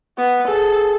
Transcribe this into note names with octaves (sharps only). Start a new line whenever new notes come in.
B3
G#4 A4